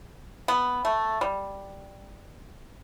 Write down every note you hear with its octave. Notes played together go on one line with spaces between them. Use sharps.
B3
A3
G3